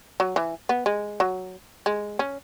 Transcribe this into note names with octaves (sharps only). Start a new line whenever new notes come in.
F#3
E3
B3
G#3
F#3
G#3
C#4